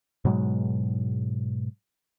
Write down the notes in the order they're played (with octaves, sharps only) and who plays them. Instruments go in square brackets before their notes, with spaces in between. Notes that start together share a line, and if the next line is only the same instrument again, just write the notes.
[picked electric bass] G#2 B2 F#3 G#3